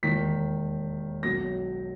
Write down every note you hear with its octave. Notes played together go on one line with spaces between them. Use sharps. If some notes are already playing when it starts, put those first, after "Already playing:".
E1 D#2 D#3 B6
B1 B2 F#3 A#6